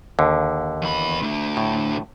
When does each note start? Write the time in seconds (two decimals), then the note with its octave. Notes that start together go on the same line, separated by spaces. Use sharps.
0.19 D#2 D3
0.82 E2 B5
1.23 D3 A3
1.57 A2